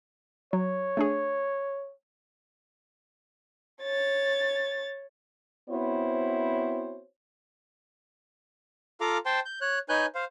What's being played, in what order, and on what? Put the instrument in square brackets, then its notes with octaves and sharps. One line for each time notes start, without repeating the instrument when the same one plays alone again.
[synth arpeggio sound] F#3 [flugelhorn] C#5
[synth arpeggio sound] A3 D4 G#4
[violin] C#5 A6
[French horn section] B3 C4 E4 F#4 C5 C#5
[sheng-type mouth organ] F4 A4 F5 A#5 D6
C5 G5 A5 C6
G6
C#5 F#6
D#4 B4 C#5 G#5 F#6 G6
C5 F5